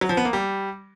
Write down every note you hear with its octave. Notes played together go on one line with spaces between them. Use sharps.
F#3
F3
B3
A#3
G3